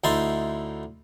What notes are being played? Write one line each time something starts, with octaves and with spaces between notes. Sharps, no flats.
D2 D#4 E4 A5 C6